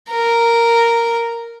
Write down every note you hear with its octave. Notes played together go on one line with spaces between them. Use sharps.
A#4